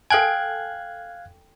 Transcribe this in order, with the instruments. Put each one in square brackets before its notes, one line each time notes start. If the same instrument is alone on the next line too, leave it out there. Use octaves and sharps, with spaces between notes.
[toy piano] A4 G#5 [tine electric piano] F5 F#6 G#6 [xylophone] G5 F#7